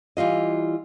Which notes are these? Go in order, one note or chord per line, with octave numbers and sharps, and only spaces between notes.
E3 G3 F4 D#5